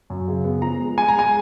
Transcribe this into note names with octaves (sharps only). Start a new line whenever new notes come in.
F#2
C#3
B3
F3 A#5
G#3
G#3 G#5
A#5
G#3 G#5